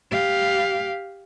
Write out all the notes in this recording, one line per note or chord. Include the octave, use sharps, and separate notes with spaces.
G4 F5